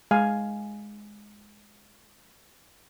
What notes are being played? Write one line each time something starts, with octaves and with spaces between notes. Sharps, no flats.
G#3 F5 G#5